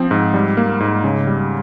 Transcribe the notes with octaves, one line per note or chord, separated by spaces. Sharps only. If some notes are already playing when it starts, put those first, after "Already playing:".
Already playing: F3 C4
G#2
G3
A#3
G#2
C#3
G3